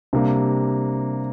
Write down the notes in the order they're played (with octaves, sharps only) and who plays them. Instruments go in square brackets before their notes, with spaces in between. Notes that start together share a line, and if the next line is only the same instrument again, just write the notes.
[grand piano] C3 G3 A#3 D4